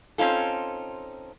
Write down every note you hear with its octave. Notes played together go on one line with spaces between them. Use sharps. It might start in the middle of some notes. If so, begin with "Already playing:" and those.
C4 C#4 D#4 F4 A4